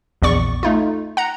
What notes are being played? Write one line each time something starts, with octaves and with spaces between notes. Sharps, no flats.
A#1 E2 D5 C#6
A3 D#4 F4
F#5 A#5